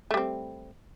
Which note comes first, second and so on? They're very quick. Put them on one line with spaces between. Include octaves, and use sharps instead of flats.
A3 G3 C4